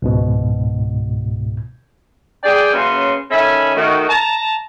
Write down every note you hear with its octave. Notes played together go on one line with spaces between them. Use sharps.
C#2 G#2 B2
G#4 D5 G5
F#2 C#3 A#3 C#4 B4 C6
D#3 C#4 A4 E5 G#5 B5
D#3 A3 F#4
A5 A#5